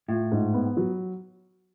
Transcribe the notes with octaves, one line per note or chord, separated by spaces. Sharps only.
A2 F4
G#2
B3
F#3